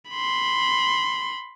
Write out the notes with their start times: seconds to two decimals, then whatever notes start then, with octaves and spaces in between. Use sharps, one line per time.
0.10 B5 C6